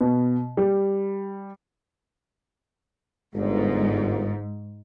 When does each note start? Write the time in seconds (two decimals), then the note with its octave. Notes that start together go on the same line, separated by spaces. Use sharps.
0.01 B2
0.57 G3
3.35 G1 G#2